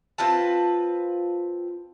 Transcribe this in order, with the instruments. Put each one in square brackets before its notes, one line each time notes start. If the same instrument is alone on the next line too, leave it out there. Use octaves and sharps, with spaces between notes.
[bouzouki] C4 F4 B4 A5